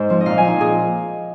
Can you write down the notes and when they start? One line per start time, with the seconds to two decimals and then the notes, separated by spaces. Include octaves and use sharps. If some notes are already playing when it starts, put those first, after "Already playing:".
Already playing: G#2 D#4 C5
0.09 F3 C4
0.21 D#5
0.26 A#2 F5
0.38 G#5
0.43 F3 C4 D#4
0.61 A#2 G#4